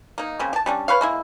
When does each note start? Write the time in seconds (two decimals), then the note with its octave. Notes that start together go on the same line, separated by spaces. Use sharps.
0.18 A#3 D#4
0.39 C#3 A#3 C4
0.53 G4 A5
0.66 G3 C#4 D4
0.88 B4 C#5 F5
1.01 G#3 A#3 E4